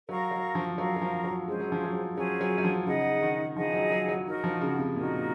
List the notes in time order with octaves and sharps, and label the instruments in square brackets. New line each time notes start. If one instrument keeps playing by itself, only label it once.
[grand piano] F#3 [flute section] A#4 F5 A#5 C#6
[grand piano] F#3
F3
[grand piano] F#3 [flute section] A#4 F5 A#5 C#6
[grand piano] F#3
F3
F#3
[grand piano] G#3 [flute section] C#4 G#4 C5
[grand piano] F#3
F3
F#3
[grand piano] F#3 [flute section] C#4 G#4 C5
[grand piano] F#3
F#3
F3
[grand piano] C#3 [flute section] D#4 G#4 D#5 F#5
[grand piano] D#3
[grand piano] F3 [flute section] D#4 G#4 D#5 F#5
[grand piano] F#3
F#3
F#3
[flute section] D#4 F#4 A#4
[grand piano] F3
C#3
C3
[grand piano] A#2 [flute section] D#4 F#4 A#4